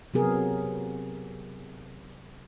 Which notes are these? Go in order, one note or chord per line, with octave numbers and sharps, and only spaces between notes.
C3 F#3 B3 G#4 A#4